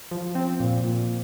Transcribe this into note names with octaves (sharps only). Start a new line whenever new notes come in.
F3
C4
A#2
A#2